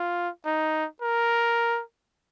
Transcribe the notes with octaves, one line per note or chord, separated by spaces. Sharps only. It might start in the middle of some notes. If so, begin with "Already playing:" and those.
Already playing: F4
D#4
A#4